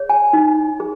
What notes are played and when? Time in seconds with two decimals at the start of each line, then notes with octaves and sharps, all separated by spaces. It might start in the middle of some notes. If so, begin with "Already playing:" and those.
Already playing: G#4 C#5
0.10 G#5
0.33 D#4
0.80 G#4